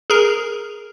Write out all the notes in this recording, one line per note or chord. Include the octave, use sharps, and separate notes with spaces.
G#4 A#4